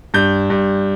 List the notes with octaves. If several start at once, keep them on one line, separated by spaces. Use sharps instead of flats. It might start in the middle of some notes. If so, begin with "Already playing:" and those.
G2 G6
G2